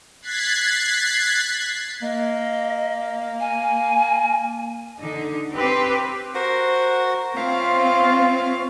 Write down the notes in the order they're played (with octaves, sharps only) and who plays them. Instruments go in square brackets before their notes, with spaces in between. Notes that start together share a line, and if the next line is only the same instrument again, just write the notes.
[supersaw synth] F#6 G#6 A6 B6 C7
[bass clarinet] A#3 [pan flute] D#5
[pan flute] G#5
[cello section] D3 D#4
C4 G4 B4
[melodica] F#4 A#4 F#5 [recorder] C5
[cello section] C4 [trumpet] F4 [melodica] C#5 E5 [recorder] F5